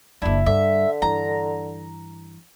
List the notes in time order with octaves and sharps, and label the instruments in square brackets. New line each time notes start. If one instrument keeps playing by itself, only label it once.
[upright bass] F#1 D#2 [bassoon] D4 [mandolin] E4
[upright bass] G2 [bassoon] D3 [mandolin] E5
[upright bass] G2 E3 [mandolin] A#5